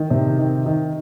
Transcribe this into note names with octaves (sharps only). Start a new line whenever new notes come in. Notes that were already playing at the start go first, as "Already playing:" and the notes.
Already playing: D#3
C3
D#3
D#3